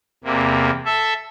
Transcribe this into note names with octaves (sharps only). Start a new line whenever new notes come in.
E2 C3 A#3
A4 E5